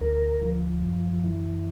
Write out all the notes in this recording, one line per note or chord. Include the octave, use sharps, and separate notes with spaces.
D2 A#4
F3
F#2
E3